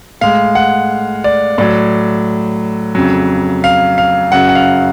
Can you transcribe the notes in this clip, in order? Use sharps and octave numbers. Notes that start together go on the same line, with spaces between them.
A2 G#3 F5
F#5
D5
A2 F#3 D5
F2 C#3 F#3
F5
F5
F#2 C#3 F#3 F#5
F#5
F5